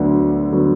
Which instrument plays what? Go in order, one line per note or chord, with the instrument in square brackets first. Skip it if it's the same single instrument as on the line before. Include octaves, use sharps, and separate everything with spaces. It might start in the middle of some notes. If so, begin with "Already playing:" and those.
Already playing: [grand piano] D2 D3 F#3 B3
D3 F#3 B3